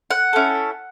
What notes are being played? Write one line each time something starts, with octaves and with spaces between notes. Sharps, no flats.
F#5
C#4 E4 A4